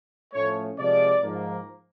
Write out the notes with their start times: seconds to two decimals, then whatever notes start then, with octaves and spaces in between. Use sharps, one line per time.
0.33 A2 F3 A3 C#4 C#5
0.78 C3 F3 G#3 D5
1.22 G#2 F3 A#3